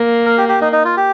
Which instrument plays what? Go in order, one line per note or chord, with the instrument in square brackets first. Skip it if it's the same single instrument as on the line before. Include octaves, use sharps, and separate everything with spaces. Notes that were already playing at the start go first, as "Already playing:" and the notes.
Already playing: [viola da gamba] A#3
[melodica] A#4
G4
G4
D#4
D#4
F4
G4